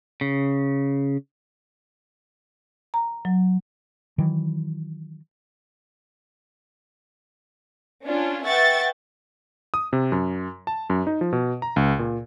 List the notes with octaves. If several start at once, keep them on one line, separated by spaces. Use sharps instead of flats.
C#3
A#5
F#3
D#3 E3 F#3
C#4 D4 F4
B4 E5 F#5 G5 C#6 A6
D#6
C3
F#2
A5
F#2
D#4
F3
B2
A#5
C#2
A#2